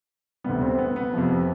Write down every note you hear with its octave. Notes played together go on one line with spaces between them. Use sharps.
D2 C3 G3 B3
C4
B3
B3
F2 C3 F3